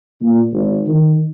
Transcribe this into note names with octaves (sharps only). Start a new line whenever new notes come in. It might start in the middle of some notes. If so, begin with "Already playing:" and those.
A#2
G#1
D#3